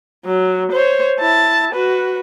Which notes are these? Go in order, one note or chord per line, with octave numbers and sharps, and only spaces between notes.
F#3
C5 C#5
E4 A5
F#4 B4